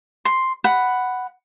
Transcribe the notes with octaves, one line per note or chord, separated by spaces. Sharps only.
C6
F#5 B5